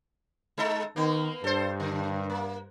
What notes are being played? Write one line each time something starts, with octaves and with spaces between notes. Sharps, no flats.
G#3 D#4 A4
D#3 A#3 B3
G2 A4 C5
D3
A#3